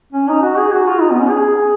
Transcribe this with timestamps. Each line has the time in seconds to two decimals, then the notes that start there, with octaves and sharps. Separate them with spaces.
0.13 C#4
0.28 D#4
0.43 F#4
0.58 G#4
0.72 F#4
0.87 F4
1.01 D#4
1.11 B3
1.20 C#4
1.30 G#4